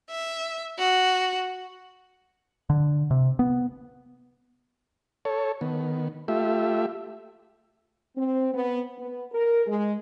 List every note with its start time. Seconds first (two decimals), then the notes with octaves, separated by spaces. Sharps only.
0.11 E5
0.78 F#4
2.70 D3
3.11 C3
3.39 B3
5.25 A4 C#5
5.61 D#3 B3
6.28 A3 F4 G4 E5
8.17 C4
8.54 B3
8.98 B3
9.32 A#4
9.66 G#3